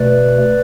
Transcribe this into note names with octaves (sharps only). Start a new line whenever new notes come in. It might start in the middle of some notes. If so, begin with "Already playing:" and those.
Already playing: B2 A3 B4 D5